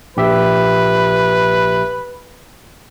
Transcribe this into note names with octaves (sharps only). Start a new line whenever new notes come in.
A#1 G4 B4 E5